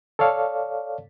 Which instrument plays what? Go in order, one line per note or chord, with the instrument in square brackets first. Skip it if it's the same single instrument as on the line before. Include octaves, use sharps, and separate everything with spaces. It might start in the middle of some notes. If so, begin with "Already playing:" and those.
[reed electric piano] A4 C#5 D5 F5